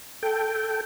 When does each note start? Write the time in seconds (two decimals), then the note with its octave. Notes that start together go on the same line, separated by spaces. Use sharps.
0.23 A4 G5